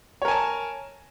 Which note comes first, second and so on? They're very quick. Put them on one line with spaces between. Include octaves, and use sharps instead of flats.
C#5 A#4 G#5 A5